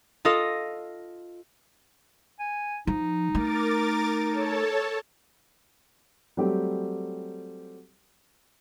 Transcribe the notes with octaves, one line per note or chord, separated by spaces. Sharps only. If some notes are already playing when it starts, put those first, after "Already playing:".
F4 A4 D#5 D#6
G#5
F3 D#4
A3 A#4 D6 A6
A4 C#5 A5
F#3 G3 A3 C4 G4